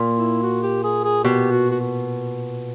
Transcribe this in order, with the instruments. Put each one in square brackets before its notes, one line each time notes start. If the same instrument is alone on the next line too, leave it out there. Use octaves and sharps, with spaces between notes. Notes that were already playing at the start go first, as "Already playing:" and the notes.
Already playing: [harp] A#2
[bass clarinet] E4
F#4
G4
G#4
G#4
[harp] B2 [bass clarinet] G4
[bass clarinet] F#4
F#4